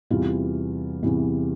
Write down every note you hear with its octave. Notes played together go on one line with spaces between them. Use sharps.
E2 C3 E3 G3 F4
E2 C3 E3 G3